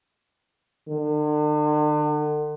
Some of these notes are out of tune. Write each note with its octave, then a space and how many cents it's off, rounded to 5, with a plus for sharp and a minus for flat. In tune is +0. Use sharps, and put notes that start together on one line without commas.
D3 +40